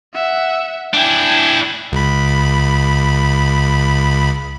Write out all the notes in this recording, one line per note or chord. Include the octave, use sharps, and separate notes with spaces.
E5 F#5
D4 E4 G5 G#5
C#2 B5